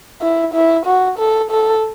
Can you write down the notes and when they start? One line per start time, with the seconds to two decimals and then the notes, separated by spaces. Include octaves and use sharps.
0.21 E4
0.54 E4
0.85 F#4
1.18 A4
1.51 A4